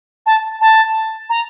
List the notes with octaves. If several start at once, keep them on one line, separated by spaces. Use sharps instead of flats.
A5
A5
A#5